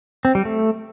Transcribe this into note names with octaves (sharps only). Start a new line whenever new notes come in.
C4
G3
A3